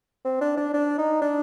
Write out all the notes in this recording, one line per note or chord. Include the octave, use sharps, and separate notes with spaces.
C4
D4
D4
D4
D#4
D4